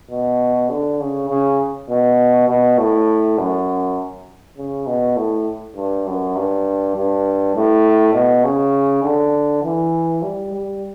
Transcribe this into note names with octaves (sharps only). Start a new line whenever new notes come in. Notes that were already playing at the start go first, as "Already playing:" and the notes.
B2
D3
C#3
C#3
B2
B2
A2
F#2
C#3
B2
A2
G2
F#2
G2
G2
A2
B2
C#3
D3
E3
G3
G3